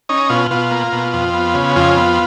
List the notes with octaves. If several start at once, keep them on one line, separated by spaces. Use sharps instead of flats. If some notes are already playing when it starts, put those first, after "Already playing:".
C#4 D#4
B2 F4
B2 F4
A#3
B2
F2
B3
C#3
F2 F4
B3